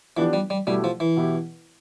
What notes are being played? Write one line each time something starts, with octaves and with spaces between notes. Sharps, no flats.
E3 F3 B3 D4 G4
G3
G3
B2 G3 A3 E4 G4
F3
E3
B2 B3 E4 G4